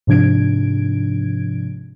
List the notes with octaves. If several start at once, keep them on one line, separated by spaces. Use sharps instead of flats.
G#2 C3 F3 D4 G#6 D7